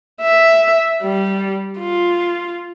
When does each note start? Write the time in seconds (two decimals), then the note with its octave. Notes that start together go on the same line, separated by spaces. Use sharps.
0.22 E5
1.03 G3
1.79 F4